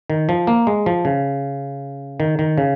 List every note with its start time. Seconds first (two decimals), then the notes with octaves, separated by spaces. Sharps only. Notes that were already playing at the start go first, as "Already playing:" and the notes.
0.10 D#3
0.29 F3
0.47 A#3
0.67 G#3
0.86 F3
1.05 C#3
2.20 D#3
2.39 D#3
2.58 C#3